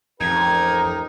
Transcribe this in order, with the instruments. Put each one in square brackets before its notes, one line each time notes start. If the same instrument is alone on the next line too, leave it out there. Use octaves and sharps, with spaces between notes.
[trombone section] A1 G4 A#4 [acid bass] F2 [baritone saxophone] D#4 [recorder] G#6